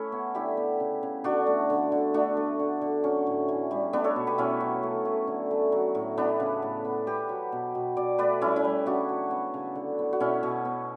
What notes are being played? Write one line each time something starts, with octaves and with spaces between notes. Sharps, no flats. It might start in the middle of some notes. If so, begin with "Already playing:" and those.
Already playing: A3 C#4 E4
B3
D3 E4 G4
B3
C#3
C#3
D3 D4 F#4
A3
D3
D3
A3 D4 F#4
A3
D3
D3
F#3 C#4
A2
E3
G3
A3 B3 D4
A4 C#5
B2
G4 B4
B2 C#4 E4
F#3
A3
A3
D3
A3
F#3
A2
E3 B3 D4
C#3
A2
B3
B3 G4 B4
F#3
B2
B2
B2 D5
A3 B4 D5
G3 C#4 E4
C#4 E4
G3
C#3 D4 F#4
F#3
B3
C#3
D3
B3
F#4
B2 C#4 E4
B2
B3